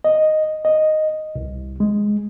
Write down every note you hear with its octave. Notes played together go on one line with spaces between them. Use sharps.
D#5
D#5
C2
G#3